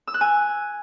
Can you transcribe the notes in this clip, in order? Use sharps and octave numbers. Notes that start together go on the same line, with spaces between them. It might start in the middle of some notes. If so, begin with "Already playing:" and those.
E6
F#6
G#5